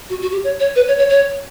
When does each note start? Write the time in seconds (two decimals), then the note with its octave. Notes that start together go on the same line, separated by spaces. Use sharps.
0.09 F#4
0.22 F#4
0.32 G4
0.44 C#5
0.59 C#5
0.76 B4
0.88 C#5
0.98 C#5
1.10 C#5